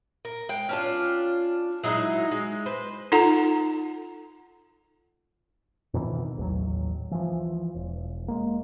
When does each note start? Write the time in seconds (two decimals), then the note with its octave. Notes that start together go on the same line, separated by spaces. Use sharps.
0.25 A#4
0.49 G#3 G5
0.69 C#4 D4 F4
1.83 F#3 G#3 D#4 E4
2.31 G#3
2.66 B4 C5
3.12 D#4 F4 A4 F#5 A#5
5.94 F2 B2 D#3 E3
6.38 A1 D#2 F#3
7.11 E3 F3
7.75 E1
8.28 G#3 A#3